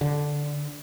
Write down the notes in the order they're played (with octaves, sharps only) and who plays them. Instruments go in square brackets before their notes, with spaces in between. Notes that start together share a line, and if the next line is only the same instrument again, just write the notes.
[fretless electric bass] D3